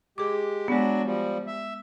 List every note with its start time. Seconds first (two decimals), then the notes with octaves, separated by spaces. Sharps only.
0.18 G#3 G4 G#4 D6
0.68 F#3 G#3 B3 D4 F#4
1.04 F3 G3
1.47 E5